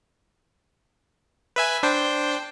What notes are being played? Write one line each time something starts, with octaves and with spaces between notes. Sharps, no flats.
B4 E5 G#5
D4 C5 G5